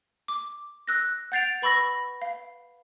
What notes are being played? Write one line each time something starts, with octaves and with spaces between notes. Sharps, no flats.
D6
E6 F#6 A#6
F#5 G6 A6 C7 D7 F7
B4 B5 C#6 E6 A#6
F5